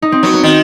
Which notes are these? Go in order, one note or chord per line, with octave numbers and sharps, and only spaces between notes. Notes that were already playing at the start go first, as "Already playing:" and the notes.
D#4
C4
F#3 B3
B3
D#3 C4